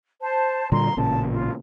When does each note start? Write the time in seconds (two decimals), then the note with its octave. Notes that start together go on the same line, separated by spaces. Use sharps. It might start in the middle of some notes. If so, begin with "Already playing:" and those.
0.21 C5 A5
0.72 A#2 D3 G3 A#5 C6
0.97 A1 A#2 C#3 A5
1.32 F4